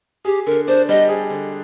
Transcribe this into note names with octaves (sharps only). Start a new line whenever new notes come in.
G4 G#4
D3 A#4
D4 C5
G3 D#5
G#4
D3